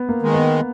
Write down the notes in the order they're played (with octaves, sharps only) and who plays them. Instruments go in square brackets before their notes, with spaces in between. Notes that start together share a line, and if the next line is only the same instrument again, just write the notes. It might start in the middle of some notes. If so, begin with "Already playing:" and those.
Already playing: [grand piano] B3
A#3
[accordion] D#3 G#3
[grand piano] B3